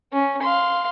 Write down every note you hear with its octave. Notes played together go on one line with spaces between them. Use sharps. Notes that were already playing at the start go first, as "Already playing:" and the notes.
C#4
F5 C6